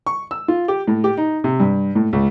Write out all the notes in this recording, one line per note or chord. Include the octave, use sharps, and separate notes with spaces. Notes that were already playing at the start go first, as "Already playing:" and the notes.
C#6
E6
F4
G4
A2
G4
D#4
C3
G2
A2
C#2